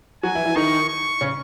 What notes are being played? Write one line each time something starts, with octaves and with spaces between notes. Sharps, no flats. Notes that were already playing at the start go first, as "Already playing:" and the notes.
F#3 F#4 G#5
E3 E4
E3 E4
D#3 D#4 C#6
C#6
C#3 C#4